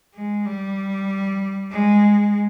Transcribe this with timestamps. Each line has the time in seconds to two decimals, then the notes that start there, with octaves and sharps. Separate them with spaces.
0.15 G#3
0.46 G3
1.71 G#3